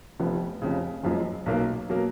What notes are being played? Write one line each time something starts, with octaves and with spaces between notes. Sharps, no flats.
F1 F2 F3 B3
F1 F2 C#3
F#1 F#2 F3 G#3
B1 B2 F#3 A#3
B2 F#3 A#3